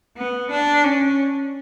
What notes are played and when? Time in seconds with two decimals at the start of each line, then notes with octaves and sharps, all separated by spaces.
0.18 B3
0.51 D4
0.84 C#4